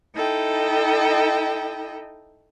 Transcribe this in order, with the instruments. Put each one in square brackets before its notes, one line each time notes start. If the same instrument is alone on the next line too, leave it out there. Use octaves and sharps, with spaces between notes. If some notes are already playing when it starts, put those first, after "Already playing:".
[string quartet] D#4 E4 A4 D#5 G5